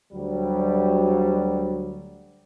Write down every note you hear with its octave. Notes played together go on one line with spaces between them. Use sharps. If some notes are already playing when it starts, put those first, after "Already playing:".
D2 F#3 G3